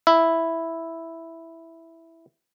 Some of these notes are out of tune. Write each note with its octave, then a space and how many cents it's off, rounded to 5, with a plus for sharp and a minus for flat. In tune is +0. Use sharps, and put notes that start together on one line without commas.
E4 +0 E5 +0